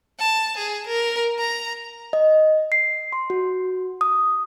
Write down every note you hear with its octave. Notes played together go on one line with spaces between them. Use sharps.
A5
G#4
A#4
A#5
D#5
C7
C6
F#4
D#6